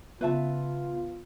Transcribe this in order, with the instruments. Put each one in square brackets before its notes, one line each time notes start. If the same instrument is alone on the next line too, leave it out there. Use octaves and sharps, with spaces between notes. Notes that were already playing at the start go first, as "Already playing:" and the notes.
[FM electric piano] C#3 B3 [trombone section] F4 [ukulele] B4 E5 A5